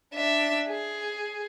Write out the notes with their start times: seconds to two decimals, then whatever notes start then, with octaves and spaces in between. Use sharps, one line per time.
0.14 D4 E5
0.68 G#4